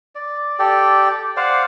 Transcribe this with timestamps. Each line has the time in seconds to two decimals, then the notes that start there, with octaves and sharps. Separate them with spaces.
0.15 D5
0.59 G4 A4 D5 G5
1.37 C5 D5 F5 F#5